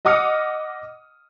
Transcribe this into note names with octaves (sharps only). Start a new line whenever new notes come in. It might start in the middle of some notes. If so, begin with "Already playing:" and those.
D#5 F#5 D6 D#6 F6 C#7